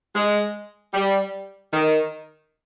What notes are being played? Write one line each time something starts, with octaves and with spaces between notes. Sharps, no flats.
G#3
G3
D#3